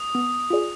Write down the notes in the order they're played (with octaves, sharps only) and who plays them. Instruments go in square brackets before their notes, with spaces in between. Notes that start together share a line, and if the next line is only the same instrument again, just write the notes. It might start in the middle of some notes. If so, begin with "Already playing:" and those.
Already playing: [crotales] D#6
[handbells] B3
F4 G#4 D5